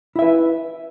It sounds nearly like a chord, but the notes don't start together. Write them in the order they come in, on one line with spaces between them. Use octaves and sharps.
E4 E5 B4